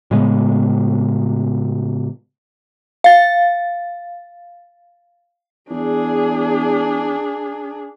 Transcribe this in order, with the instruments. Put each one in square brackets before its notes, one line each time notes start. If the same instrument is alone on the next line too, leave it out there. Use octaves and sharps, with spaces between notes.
[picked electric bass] A2 C#3 G#3 B3
[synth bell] F5 A6
[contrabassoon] E2 [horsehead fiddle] D4 G#4